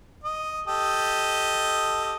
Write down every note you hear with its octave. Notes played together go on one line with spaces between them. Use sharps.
D#5
G4 A4 D#5